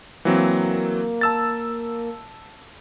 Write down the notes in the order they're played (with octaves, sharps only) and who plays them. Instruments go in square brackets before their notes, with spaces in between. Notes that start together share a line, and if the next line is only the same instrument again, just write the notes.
[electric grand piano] E3 F#3 C4 [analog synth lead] A#3
[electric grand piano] A5 E6 A6